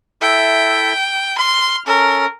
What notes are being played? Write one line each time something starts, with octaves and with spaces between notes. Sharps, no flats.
E4 A4 E5 G5
C6 F6
C#4 A4 A#4